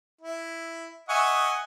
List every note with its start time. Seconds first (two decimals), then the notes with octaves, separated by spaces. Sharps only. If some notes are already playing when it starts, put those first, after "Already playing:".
0.21 E4
1.09 D#5 E5 F#5 G#5 C#6